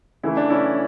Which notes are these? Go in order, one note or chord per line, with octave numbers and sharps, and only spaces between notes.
C#3 E3 A3 E4
D4
C#4 E4